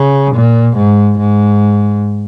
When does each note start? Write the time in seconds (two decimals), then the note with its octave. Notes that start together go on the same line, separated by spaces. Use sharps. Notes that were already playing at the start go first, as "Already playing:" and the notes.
Already playing: C#3
0.35 A#2
0.77 G#2
1.19 G#2